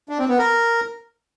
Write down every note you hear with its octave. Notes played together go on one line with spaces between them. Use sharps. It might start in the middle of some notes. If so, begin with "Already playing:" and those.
D4
C4
B3
A#4